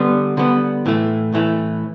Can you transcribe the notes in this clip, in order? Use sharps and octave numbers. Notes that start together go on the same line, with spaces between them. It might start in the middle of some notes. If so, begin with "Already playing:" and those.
Already playing: D3 G3 B3
D3 G3 B3
A2 E3 A3
A2 E3 A3